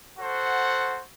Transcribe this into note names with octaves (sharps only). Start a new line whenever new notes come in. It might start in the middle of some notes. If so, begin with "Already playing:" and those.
F#4 A4 C5 F#5